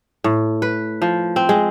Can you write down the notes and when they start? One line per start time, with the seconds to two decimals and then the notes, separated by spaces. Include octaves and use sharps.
0.24 A2
0.62 B4
1.02 F3
1.36 C4
1.49 G#3